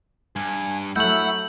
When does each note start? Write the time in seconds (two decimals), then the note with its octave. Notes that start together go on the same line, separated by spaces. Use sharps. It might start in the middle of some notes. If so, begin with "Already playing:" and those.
0.36 G2 G#5
0.96 F#3 A3 E4 F#5 E6 G6 F#7